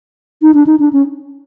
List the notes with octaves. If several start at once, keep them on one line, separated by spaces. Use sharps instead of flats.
D#4
D4
D#4
D4
C#4